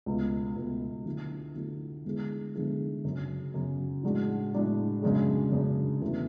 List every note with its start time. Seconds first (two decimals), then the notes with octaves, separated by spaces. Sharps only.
0.06 C#2 B2 A3
0.56 C#2 B2 A3
1.06 D3 F#3 A3 E4
1.55 D3 F#3 A3 E4
2.05 D3 G#3 B3 E4 G#4
2.55 D3 G#3 B3 E4 G#4
3.04 F#2 C#3 F#3
3.54 F#2 C#3 F#3
4.03 A2 G#3 D4 F#4
4.53 A2 G#3 D4 F#4
5.02 F#2 C#3 G#3 D4 G#4
5.52 F#2 C#3 G#3 D4 G#4
6.02 E2 C#3 F#3 A3 E4